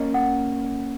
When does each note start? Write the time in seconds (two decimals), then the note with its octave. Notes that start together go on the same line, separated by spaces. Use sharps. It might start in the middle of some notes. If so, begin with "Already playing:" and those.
Already playing: A#3 C#4 D#5
0.14 F#5